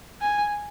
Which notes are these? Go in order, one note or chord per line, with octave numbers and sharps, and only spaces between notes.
G#5